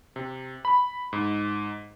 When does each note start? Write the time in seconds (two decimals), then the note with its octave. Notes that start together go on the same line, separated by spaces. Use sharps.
0.16 C3
0.65 B5
1.13 G#2